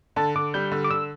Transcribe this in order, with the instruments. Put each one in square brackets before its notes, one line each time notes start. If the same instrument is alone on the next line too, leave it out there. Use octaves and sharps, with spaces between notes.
[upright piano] D3 [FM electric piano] A5
[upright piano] D3 [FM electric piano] D6
[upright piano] G3 [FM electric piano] G6
[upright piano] D3
[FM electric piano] D6
[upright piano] D3 [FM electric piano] E6